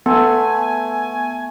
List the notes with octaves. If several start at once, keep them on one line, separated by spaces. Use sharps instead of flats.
A3 B3 G#5